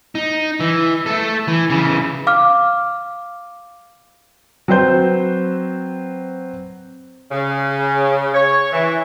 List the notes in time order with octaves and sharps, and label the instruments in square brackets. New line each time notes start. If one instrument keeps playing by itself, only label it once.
[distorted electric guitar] D#4
E3
A3 A4
E3
C#3 E3
[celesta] F5 D6 F6
[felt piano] F#3 C4 B4 C5 G6
[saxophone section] C#3
C#5
E3